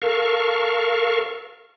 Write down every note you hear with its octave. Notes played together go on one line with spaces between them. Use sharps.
A4 A#4 F5 C#6